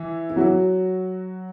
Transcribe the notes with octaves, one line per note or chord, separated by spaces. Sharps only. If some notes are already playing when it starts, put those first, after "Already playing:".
Already playing: E3 E4
E4
F#3 F#4